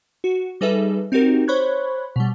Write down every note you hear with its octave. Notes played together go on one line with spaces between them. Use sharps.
F#4
G3 D#4 G#4 A4 B4 E5
C4 D#4 F#4 G4 A#4
C5 C#5 B5 C#6 F#6 G#6
B2 G3